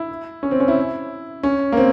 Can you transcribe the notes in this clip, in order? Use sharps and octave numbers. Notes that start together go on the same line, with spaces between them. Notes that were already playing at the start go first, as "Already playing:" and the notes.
Already playing: E4
C#4
C4
C#4
E4
C#4
A#3
C4